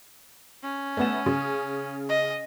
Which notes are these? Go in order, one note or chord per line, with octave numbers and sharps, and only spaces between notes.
C#4
A3 B3 E7
C#3
D#5